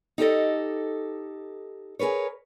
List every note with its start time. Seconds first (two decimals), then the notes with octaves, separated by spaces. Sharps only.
0.18 D#4 G4 A4 D#5
1.99 G#4 A#4 B4 C#5